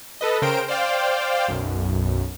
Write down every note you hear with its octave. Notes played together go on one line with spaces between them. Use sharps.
A4 B4 D#5
C#3 A#4 C5 G5 D7
C5 D5 F5 G5
B1 F#2